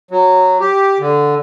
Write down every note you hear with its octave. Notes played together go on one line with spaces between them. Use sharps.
F#3
G4
D3